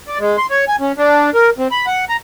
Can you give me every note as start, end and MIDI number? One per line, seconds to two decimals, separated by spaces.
0.08 0.18 74
0.19 0.37 56
0.38 0.46 84
0.51 0.65 73
0.68 0.76 80
0.80 0.92 61
0.98 1.30 62
1.34 1.50 70
1.58 1.68 60
1.71 1.86 83
1.87 2.05 78
2.09 2.17 82